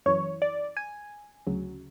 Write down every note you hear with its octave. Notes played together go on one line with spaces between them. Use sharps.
F#2 E3 C#5
D5
G#5
D2 C#3 F#3